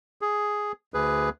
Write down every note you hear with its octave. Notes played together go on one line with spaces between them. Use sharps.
G#4
D2 G#4 B4